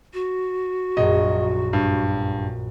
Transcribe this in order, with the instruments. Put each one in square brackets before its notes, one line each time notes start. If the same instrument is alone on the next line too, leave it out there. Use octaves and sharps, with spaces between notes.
[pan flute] F#4
[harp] A#1 F#2 [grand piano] D#5
[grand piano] G2